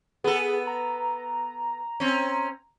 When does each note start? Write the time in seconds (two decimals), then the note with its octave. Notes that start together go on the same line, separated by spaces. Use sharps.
0.24 B3 G#4 A4
0.67 A#5
2.00 C4 C#4